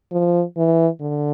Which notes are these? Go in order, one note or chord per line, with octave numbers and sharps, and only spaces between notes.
F3
E3
D3